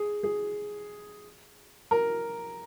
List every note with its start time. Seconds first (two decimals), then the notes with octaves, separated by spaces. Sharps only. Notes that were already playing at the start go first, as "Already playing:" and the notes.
Already playing: G#4
0.23 G#4
1.91 A#4